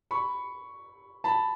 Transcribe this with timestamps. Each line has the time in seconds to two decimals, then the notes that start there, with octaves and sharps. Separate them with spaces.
0.11 B5 C#6
1.24 A5 B5